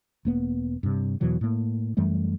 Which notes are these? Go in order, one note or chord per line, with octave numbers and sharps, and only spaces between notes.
E1 A#3 B3
G2 C3
E2 B2 E3 F#3
A2 A#3
F#2 E3 G3 A3